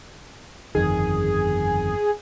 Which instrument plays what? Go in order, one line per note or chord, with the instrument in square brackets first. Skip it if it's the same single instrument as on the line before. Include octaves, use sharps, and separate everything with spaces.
[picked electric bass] G1 F2 D#3 [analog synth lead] G#4